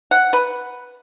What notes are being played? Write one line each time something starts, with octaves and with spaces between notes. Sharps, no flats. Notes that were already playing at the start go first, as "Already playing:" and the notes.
F#5
B4